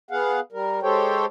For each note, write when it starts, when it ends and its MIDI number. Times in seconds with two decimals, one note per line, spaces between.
0.11 0.40 59
0.11 0.40 68
0.11 0.40 77
0.11 0.40 78
0.52 0.80 55
0.52 0.80 70
0.83 1.25 56
0.83 1.25 67
0.83 1.25 69
0.83 1.25 72
0.83 1.25 73
0.83 1.25 79